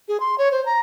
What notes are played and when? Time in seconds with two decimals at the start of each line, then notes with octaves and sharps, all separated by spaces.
0.08 G#4
0.20 C6
0.38 C#5
0.52 C5
0.66 A#5